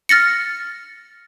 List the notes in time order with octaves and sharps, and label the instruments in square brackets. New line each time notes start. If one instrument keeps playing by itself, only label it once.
[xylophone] F6 A6 A#6 C#7